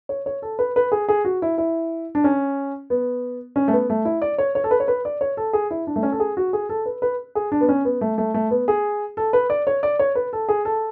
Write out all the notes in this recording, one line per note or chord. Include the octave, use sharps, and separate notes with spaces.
C#5
C#5
A4
B4
B4
G#4
G#4
F#4
E4
E4
D4
C#4
B3
C#4
A3
B3
A3
E4
D5
C#5
C#5
A4
B4
C#5
B4
D5
C#5
A4
G#4
E4
D4
A3
C#4
A4
G#4
F#4
G#4
A4
B4
B4
G#4
D4
B3
C#4
B3
A3
A3
A3
B3
G#4
A4
B4
D5
C#5
D5
C#5
B4
A4
G#4
A4